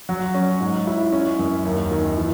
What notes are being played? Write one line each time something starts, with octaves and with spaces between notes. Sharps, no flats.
F#3
C#4
G#2
E4
C#4
F#2
D#2
D#3
E3